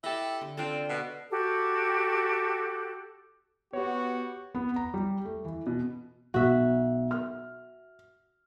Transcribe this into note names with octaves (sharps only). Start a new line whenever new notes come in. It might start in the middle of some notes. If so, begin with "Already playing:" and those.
E4 G4 A4 D#5
D3
C4 D4 F4 A4
B2
F#4 G4 A4
B3 F#4 G4 C#5
B3
A#5
G3
A3
E3
B2
B1 F#4 E5
F6